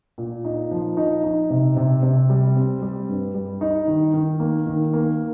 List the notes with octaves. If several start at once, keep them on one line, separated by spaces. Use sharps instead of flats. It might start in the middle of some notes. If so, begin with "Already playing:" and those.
A#2
D#4
F3
D#4
D#4
C3
C3
C3
G3
C4
G3
G2
G3
D#4
D#3
D#3
A#3
D#3
A#3